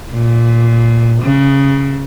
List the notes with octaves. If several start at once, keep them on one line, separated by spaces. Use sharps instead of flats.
A#2
C#3